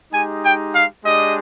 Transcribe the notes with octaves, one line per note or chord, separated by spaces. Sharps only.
G#3 D#4 G4 G#5
G5
F5
G#3 D4 G4 D#5